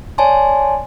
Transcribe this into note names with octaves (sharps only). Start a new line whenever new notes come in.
C#5 D5 G#5 A5 C6